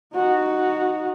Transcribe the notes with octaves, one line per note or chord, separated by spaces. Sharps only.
D#4 F#4